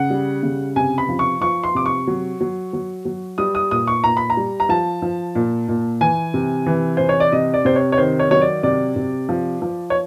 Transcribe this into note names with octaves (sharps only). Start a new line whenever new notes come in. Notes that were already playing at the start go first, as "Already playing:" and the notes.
Already playing: C#3 F#5
G3
C#3
C3 G#5
B5
F3
C#6
F3 C#6
C6
C3 D6
C#6
F#3
F#3
F#3
F#3
G3 D#6
D#6
A#2 D#6
C#6
A#2 A#5
B5
A#5
G3
A#5
F3 A5
F3
A#2
A#2
E3 G#5
C3
E3
C3 C5
C#5
D5
C3 D#5
D5
C3 C5
C#5
C#5
D#3 C5
C#5
F#3 C#5
D5
C3 D5
C3
F3
F3
C#5